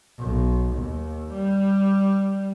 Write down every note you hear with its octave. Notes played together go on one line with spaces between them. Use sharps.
B1
D#2
G3